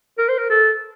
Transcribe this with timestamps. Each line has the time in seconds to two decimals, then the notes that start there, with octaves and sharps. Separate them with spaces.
0.18 A#4
0.29 C5
0.38 A#4
0.50 A4